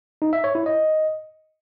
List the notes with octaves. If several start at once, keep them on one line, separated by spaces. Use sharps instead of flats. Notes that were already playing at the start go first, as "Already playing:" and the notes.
D#4
E5
C#5
E4
D#5